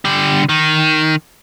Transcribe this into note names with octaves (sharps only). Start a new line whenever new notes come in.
D3 G3
D#3